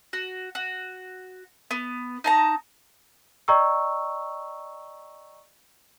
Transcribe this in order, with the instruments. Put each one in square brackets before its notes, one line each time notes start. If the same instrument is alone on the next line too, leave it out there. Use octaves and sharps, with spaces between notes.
[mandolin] F#4
F#4
B3
D#4 A5 A#5
[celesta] D5 D#5 G5 A#5 C#6 E6